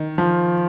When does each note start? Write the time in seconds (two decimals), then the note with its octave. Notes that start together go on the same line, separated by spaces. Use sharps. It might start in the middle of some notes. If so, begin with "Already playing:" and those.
Already playing: D#3
0.18 F3